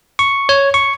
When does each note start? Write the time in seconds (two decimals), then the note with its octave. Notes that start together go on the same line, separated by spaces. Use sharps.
0.19 C#6
0.49 C#5
0.74 C#6